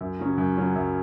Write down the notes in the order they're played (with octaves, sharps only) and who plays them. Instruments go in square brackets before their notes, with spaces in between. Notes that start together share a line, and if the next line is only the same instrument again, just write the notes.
[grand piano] F#2
C#3 F#3 C#4
F#2
C#3 F#3 C#4
F#2